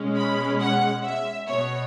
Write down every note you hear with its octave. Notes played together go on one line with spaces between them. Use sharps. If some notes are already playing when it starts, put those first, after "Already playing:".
Already playing: B2 G#3 C#4
B5
F#5
E5
B2 B3 C#5